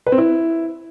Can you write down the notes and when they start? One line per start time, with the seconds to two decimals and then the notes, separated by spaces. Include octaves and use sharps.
0.06 B4
0.12 C4
0.18 E4